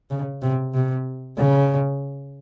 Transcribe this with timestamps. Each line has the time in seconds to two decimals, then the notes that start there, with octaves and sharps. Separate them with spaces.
0.10 C#3
0.42 C3
0.74 C3
1.38 C#3